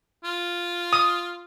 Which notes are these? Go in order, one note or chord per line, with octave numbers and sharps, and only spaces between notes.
F4
D#6